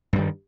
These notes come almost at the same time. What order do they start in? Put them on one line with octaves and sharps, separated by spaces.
G2 G3 D#3